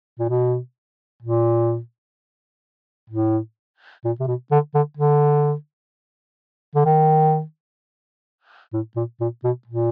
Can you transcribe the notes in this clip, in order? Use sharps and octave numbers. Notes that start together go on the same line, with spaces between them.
A#2
B2
A#2
A2
A#2
C3
B2
D3
D3
D3
D3
D#3
A2
A#2
A#2
B2
A#2